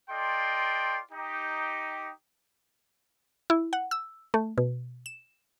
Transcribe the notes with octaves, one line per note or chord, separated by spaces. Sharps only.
F4 A4 D5 D#5 G5 C6
D#4 G4
E4
F#5
E6
A3
B2
E7